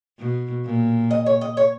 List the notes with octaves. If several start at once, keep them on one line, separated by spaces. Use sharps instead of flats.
B2
A#2
D#5
C#5
D#5
C#5